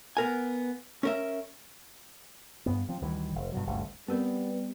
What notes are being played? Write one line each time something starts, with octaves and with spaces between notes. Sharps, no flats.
B3 A#4 G#5
C#4 A#4 E5
G2 B3
F3 C4
D2 D#3 E3 G3
F1
G2 B2 F#3
G1 D2 G2 C#3
G3 B3 C4 G4 A#4